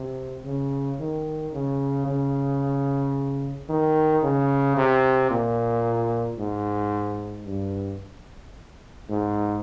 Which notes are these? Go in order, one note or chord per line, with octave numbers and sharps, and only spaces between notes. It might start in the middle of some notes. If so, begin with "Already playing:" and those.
Already playing: C3
C#3
D#3
C#3
C#3
D#3
C#3
C3
A#2
G#2
G2
G#2